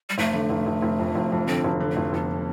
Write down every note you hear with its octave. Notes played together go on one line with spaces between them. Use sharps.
G3
F1 A3
D3
F1
F1
F1
F2
F1
F2
D3 C4
F1
D3
A3
F1
F1 B3